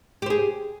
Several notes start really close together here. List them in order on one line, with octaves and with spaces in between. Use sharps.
G4 C5 G#4